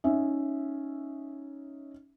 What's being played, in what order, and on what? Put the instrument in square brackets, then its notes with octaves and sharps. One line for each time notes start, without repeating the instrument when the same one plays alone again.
[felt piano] C#4 D#4 E5